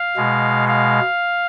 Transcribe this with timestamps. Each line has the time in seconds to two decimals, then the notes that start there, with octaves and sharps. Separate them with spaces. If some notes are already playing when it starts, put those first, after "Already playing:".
Already playing: F5
0.16 B2 G#3
0.68 F5